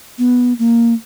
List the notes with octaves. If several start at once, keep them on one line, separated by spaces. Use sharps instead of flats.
B3
A#3